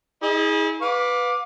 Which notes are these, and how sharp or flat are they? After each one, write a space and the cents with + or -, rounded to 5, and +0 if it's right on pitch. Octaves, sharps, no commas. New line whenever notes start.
E4 -40 G#4 +0 D#5 +0
B4 +0 F5 +35 D6 +0